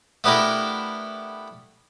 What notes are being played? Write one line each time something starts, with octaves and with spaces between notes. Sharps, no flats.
A3 B3 D4 E4 G4 A#4